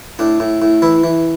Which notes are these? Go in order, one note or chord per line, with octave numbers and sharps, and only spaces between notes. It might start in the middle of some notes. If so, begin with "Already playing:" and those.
A2 D4
A2
A2
E3 E4
E3